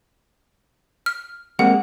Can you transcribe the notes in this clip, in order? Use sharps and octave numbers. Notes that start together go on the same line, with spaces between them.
F6
G#3 A#3 C4 F#5